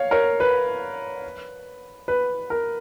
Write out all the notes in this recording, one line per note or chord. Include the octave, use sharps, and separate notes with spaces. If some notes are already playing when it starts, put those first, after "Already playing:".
Already playing: C#5 F5
A#4 C#5
B4
B4
A#4